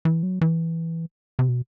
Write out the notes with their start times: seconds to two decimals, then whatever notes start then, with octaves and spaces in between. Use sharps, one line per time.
0.05 E3
0.23 F#3
0.41 E3
1.39 C3
1.48 B2